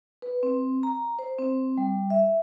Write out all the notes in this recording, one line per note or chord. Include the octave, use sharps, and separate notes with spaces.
B4
C4
A#5
C5
C4
G3
E5